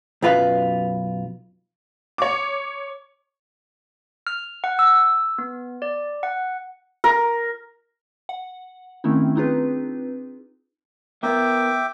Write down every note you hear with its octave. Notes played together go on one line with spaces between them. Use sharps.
B1 F#2 F4 B4
C#5 D6
F6
F#5
E6
B3
D5
F#5
A#4
F#5
D#3 A3 C4 C#4 D#4 E4
C4 D4 D#4 F4 G#4 B4
B3 E4 A#4 E5 G5 D6